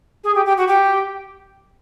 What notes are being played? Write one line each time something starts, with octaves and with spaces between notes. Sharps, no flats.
G#4
G4
G4
F#4
G4